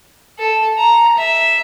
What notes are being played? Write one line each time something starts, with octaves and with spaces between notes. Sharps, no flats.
A4
A#5
E5